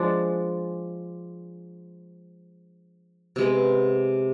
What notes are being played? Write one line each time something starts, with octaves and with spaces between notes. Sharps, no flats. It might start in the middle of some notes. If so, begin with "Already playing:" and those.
Already playing: F3 G#3 D4
C3 G#3 B3